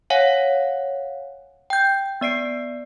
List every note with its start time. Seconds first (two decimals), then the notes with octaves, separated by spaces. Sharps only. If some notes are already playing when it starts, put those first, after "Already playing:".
0.10 C#5 F5 F#5 G#5
1.70 G5 G6
2.21 B3 D5 C7 D7